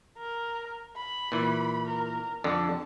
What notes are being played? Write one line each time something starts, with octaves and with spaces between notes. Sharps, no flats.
A#4
B5
A#2 E3
A#4
F2 D3 A5